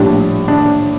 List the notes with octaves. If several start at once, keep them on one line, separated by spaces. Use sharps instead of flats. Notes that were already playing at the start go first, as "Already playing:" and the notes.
Already playing: A#1 A2 G3 D4
D4